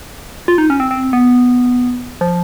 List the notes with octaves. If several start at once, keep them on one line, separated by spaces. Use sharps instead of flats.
F4
D#4
C#4
C4
C4
B3
F3